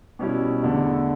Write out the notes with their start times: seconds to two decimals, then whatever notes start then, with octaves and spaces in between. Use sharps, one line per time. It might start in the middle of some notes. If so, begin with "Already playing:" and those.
0.19 B2 G3 C#4 E4
0.62 E2 D3 A3 E4